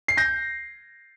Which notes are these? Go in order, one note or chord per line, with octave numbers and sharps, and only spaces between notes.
C7
G6 A#6